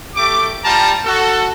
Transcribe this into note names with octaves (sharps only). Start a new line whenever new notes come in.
A3 G4 D6
G3 F4 G5 A5 A#5
F#4 A4